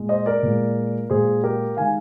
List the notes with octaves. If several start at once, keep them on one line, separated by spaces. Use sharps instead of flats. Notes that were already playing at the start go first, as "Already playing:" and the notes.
Already playing: A#2 G#3
C5 D#5
A#4 D5
A#2 G#3
A#2 G#3 G#4 C5
G4 A#4
D#3 G#3 F5 G#5